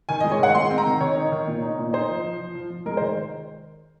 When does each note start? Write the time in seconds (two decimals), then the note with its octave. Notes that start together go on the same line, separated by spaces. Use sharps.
0.09 D#3 G#5
0.20 D#5
0.24 G#3
0.32 C#5
0.39 D#3 F#5
0.55 G#3 C6
0.70 C4
0.78 A#5
0.86 D#3
1.01 D#3 C#5
1.16 D#4
1.32 D#3
1.47 A#2
1.62 D#4
1.78 A#2
1.93 D#4 C5
2.08 F3
2.24 F3
2.39 F3
2.55 F3
2.71 F3
2.86 G#3 A#4
2.97 C5
3.01 D#3